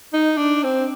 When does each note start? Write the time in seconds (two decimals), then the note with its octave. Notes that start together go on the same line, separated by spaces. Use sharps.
0.13 D#4
0.38 D4
0.64 C4